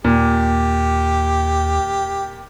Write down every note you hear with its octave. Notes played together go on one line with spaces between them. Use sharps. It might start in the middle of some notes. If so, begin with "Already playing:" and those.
D#2 A#2 G4